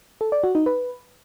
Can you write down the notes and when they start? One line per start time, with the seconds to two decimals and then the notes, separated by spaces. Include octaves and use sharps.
0.21 A4
0.32 D5
0.44 F#4
0.55 D#4
0.66 B4